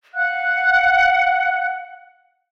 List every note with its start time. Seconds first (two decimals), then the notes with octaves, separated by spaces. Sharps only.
0.14 F5 F#5 F#6